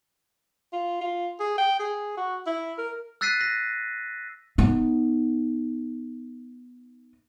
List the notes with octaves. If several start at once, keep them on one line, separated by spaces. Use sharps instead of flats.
F4
F4
G#4
G5
G#4
F#4
E4
A#4
E6 F#6 A6 B6 C7 D#7
A#6
B3 D#4